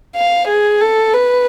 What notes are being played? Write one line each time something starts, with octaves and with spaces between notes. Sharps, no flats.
F5
G#4
A4
B4